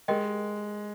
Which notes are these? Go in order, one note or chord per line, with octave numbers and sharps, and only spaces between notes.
G#3 G4 A#4 D#5 G5